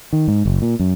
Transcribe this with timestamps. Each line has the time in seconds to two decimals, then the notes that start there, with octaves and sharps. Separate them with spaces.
0.13 D#3
0.28 G#2
0.46 F#1
0.62 A#2
0.79 F#2